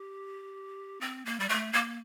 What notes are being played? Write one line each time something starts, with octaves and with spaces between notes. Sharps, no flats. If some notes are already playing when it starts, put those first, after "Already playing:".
Already playing: G4
C4
A#3
G3
A3
A#3